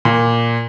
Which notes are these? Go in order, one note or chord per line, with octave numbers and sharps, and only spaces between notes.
A#2